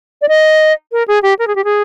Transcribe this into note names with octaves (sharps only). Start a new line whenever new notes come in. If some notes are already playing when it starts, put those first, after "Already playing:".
D5
D#5
A#4
G#4
G4
A#4
G#4
G4
G#4